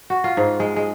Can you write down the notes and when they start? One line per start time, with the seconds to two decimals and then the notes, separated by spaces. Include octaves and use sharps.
0.10 F#4
0.24 F4
0.37 G#2
0.60 G#3
0.76 G#3